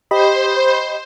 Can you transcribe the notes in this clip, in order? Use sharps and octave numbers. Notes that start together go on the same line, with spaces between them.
G4 C5 D#5 B5